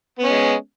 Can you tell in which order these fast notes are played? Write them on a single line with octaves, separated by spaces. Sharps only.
B3 C#4 G#3